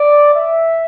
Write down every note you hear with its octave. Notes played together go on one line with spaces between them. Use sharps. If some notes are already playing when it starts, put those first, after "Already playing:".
Already playing: D5
E5